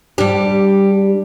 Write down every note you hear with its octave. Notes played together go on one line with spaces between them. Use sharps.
G3 D4 G4